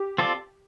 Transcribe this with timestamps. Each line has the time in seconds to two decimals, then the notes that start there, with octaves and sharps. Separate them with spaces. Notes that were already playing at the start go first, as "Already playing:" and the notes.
Already playing: G4
0.18 C4 F4 A4 D5